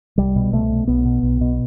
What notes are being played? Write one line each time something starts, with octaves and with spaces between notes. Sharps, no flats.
C2 G3
B2
C2 A3
B2
B1 B3
B2
B1
B2